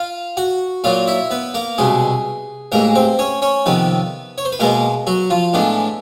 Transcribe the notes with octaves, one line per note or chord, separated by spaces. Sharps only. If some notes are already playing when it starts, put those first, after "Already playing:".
Already playing: F4 F5
F#4 F#5
A#2 F#3 A#3 F4 F5
E4 E5
B3 B4
A#3 A#4
C2 B2 G#3 G#4
A1 G#2 E3 A#3 A#4
C4 C5
C#4 C#5
C#4 C#5
F2 C3 D#3 B3 B4
C#5
C5
B4
B2 G#3 A#3 B3 A#4
F#3 F#4
F3 F4
A2 E3 G#3 B3 D4